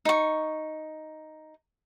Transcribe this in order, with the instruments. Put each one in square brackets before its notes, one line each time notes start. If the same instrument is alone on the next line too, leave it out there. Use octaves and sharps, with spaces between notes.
[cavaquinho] D#4 C#6